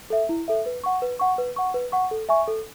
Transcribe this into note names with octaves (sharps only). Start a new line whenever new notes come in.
A4 E5
E4
A4 E5
B4
F#5 C#6
B4
F#5 C#6
B4
F#5 C#6
B4
F#5 C#6
A4
E5 G#5 C#6
A4